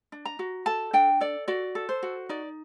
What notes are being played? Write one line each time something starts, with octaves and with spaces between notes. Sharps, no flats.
D4
A#5
F#4
A4 A5
D4 G5
A4 D5
F#4 D5
A4
C5
F#4
D#4 D5